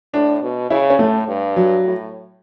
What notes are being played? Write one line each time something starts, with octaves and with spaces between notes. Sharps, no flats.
A2 D4
B2
C#3 E4
C#4
A2 A3
G2
F#3
A2